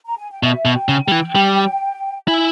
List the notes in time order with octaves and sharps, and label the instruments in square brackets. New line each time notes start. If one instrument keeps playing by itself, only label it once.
[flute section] A#5
G#5
G5
[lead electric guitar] B2 [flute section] E5
[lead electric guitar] B2
[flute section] G5
[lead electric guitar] C#3
[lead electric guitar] G3 [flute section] G5
[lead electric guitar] E3
G3
[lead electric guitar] E4 [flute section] G#5